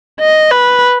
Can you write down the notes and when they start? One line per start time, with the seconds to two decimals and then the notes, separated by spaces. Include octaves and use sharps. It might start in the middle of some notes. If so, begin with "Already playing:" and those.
0.20 D#5
0.51 B4